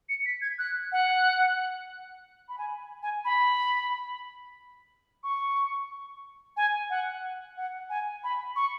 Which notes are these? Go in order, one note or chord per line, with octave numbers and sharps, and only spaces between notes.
C#7
B6
G#6
F#6
F#5
B5
G#5
G#5
B5
C#6
G#5
F#5
F#5
G#5
B5
C#6